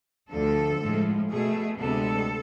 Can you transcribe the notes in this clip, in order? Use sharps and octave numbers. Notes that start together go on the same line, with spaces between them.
D2 D3 F3 A4
A2 F3 G#3
B2 A3 G#4
D2 C3 G#3 B3 A4